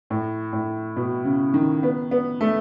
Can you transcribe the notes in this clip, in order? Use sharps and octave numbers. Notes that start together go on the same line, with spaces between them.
A2
A2
B2
C#3
D#3
B3
B3
A3